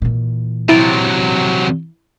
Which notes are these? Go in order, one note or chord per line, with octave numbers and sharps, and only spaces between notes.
A#2 E3
C3 F#3 E4 A6 D7